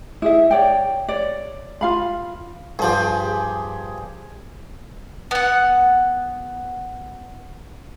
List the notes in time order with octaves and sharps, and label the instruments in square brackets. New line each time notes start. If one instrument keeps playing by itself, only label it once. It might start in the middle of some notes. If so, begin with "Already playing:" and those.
[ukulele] E4 G#4 E5
C#5 D5 G5
C#5 D5
F4 F5 B5
[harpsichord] G2 F3 [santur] G4 G#4
[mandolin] B3 F#5